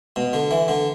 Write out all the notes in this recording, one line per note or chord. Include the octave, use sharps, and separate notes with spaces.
B2
D3
E3
D3